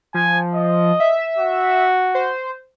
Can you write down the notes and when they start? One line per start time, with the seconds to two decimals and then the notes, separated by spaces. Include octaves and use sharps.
0.14 F3 G#5
0.54 D#5
1.00 E5
1.38 F#4
2.15 C5